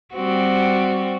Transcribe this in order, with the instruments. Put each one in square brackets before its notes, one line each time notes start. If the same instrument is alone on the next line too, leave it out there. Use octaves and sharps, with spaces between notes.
[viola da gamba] G3 C4 F#4